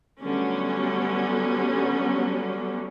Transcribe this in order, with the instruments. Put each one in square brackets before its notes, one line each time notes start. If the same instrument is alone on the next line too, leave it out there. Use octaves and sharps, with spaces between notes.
[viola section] D3 F#3 G3 A3 B3 C#4